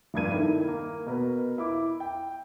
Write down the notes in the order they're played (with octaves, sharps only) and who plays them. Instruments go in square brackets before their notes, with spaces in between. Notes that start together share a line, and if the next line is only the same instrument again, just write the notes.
[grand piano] F1 G2 A#3 G#6 D#7
D#3 E4 A4 A#4
A#3
B2 A#4 B4
E4 D6
G5